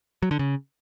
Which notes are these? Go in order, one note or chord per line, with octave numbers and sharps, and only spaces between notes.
F#3
D3
C#3